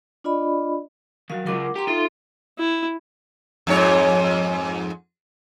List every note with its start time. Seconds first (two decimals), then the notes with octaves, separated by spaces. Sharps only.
0.24 D4 F4 D5 D#5 B5
1.30 D#3 F#3 F#4 F5
1.46 C#2 F4 A#4 F#5 D6
1.76 G4 G5 A#5 C6
1.87 D#4 F4 A4 E5 C6
2.59 E4
3.67 F2 G#2 C#5